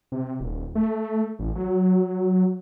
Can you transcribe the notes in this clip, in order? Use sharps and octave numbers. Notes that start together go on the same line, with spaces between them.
C3
D#1
A3
A1
F#3